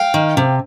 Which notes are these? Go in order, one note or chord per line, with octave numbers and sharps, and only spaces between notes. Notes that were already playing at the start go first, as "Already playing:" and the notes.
Already playing: F5 G5
D#3
C3